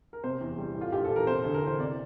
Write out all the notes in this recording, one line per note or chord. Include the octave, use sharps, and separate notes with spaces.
A#4
C3 C5
E2
G3
A2
F4
A#1 G4
A4
E3
A#4
C3 C5
D2 A4
A#4
E3 C5
C3 D5